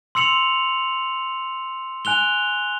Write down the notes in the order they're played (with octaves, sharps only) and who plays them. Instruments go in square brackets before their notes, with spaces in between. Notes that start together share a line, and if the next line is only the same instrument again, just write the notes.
[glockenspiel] C6 E6 C#7 F7 F#7
G#5 F#6 F7 G7